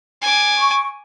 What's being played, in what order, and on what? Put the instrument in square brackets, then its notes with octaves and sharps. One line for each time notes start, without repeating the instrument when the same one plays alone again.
[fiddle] G#5 D6
[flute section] C#6